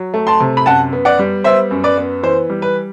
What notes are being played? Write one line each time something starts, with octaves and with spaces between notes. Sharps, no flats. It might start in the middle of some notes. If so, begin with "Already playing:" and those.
Already playing: F#3
A3
A5 C6
C3
B5
F#2 F#5 A5
B3
D5 F#5
G3
B3 C5 E5
F#2
B4 D5
B3
E3 C5
G3
B4